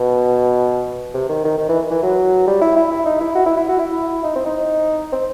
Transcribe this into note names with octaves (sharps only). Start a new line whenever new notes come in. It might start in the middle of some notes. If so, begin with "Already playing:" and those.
Already playing: B2
C3
D#3
D#3
D#3
E3
E3
F#3
G3
E4
E4
E4
D#4
E4
F#4
E4
E4
F#4
E4
D#4
C4
D#4
C4